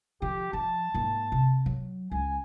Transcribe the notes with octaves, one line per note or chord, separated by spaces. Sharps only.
D3 F3 G4
F3 A5
G#2 A#3
C3
F#3
C#2 G#5